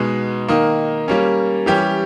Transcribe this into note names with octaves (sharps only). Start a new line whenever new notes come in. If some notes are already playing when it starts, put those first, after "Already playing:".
Already playing: B2 G#3 B3 D#4
D#3 A#3 D#4
G3 A#3 C#4
E3 G3 C#4 G4